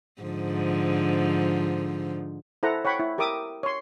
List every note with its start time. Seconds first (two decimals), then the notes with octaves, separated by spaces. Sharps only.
0.22 G#2 D3 F3
2.63 E4 A4 C5 F#5 A#5
2.85 C#5 F#5 G5 B5 C#6
2.99 E4
3.18 G4 A#4 E5 D6 D#6
3.63 C#5 C6